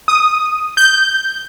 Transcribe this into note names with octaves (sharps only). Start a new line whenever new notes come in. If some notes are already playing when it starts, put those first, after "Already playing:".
D#6
G6